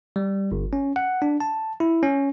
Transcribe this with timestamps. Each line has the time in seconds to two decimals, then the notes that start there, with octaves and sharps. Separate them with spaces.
0.16 G3
0.52 G1
0.73 C#4
0.96 F#5
1.22 D4
1.40 A5
1.80 E4
2.03 C#4